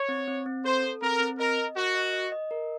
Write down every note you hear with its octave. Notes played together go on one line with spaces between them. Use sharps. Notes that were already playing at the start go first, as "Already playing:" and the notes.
Already playing: C#5
C4
C4
C4
A4 C5
A4
C4 A#4
C4
A#4 D#5
D#5
F#4 A#4
D#5
D#5
D#5
A#4